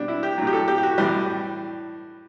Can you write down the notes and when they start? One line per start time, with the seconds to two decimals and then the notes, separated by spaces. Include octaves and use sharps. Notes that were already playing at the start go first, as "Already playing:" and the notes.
Already playing: B2 G3 D4
0.08 E4
0.23 G4
0.38 A2 F#3
0.47 G4
0.53 A4
0.68 G4
0.78 G4
0.83 F#4
0.98 A2 E3 G3